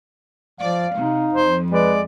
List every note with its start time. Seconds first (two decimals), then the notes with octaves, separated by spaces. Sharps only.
0.60 F3 D5 F5
0.97 C3 D#4
1.33 F2 C5
1.72 G#3 B4 D5